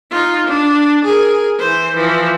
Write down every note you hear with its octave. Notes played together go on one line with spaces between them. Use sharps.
D#4 F4
D4
G#4 A#4
E3 C5
E3 F3